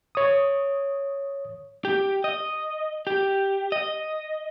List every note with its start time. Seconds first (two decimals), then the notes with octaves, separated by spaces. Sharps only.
0.15 C#5 D#6
1.85 G4
2.24 D#5
3.07 G4
3.72 D#5